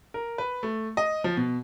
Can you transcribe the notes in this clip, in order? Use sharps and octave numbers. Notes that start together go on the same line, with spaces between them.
A#4
B4
A3
D#5
F3
B2